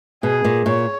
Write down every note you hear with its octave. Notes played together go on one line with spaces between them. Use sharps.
B2 G#4
A#2
A#2 C#5